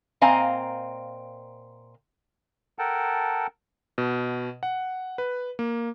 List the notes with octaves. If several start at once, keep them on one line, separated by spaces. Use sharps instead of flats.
A#2 C4 D#5 F5 G#5 A#5
A4 A#4 F#5 G5 A5
B2
F#5
B4
A#3